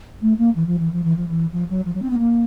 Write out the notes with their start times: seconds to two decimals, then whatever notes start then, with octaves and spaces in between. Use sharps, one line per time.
0.21 A3
0.38 A#3
0.55 E3
0.66 F3
0.78 E3
0.92 F3
1.03 E3
1.16 F3
1.28 E3
1.52 F3
1.69 F#3
1.85 F3
1.94 F#3
2.02 C4
2.10 B3
2.18 A#3